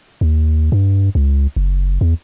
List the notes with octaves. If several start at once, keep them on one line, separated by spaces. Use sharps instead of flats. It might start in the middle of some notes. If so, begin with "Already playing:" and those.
D#2
G2
C#2
F#1
E2